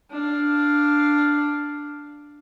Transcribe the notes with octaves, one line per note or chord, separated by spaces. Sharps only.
D4 F5